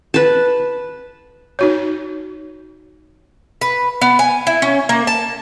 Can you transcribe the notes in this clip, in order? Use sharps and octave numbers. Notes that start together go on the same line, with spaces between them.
B4 A5
D#4 F#4 C#5
B4
B3
G#5
E4
C#4
A#3
A5